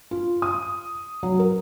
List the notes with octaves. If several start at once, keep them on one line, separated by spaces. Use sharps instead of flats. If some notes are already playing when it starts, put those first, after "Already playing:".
F4
D#6
F#3
A#4